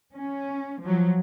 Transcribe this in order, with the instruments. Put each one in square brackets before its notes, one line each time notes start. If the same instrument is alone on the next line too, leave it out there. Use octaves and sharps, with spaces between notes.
[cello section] C#4
F3 F#3